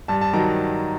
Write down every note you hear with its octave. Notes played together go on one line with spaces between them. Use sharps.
G2 A5
A5
D#3 F#3 A#5